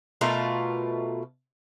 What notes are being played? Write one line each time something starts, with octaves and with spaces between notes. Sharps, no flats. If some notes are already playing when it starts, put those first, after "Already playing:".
B2 A3 F4 A#4